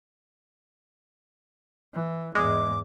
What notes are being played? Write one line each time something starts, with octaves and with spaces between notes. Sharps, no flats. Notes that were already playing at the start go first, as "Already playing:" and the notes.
E3
E2 G#2 G#3 D6